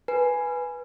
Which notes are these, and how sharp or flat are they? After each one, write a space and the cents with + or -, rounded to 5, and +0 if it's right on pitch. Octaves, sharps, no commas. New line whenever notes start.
B4 +0 G#5 +0